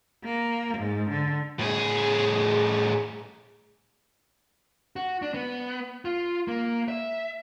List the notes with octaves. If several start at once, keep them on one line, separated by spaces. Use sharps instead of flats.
A#3
G#2
D3
A2 G#4
F#4
D4
B3
F4
A#3
E5